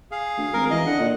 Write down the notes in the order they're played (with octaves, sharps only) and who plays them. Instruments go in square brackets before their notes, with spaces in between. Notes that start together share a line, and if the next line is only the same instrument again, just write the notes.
[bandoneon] G#4 F5
[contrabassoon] D2
[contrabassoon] G#1 [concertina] A#4
[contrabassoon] E3 [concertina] D#5
[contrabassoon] D3 [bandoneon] F#5
[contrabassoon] A#2